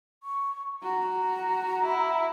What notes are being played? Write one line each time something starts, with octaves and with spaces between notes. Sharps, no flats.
C#6
F#4 A#5
E4